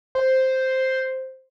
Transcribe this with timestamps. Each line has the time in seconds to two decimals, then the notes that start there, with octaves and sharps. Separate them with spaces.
0.15 C5